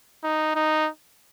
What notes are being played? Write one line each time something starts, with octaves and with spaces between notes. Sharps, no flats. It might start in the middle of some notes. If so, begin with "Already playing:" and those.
D#4
D#4